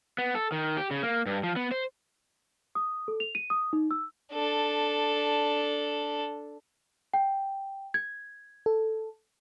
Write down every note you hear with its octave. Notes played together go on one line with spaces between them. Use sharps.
B3
A4
D#3
G4
C#3
A#3
G2
F3
B3
C5
D#6
A4
F7
D#7
D#6
D#4
E6
D4 A4
G5
G#6
A4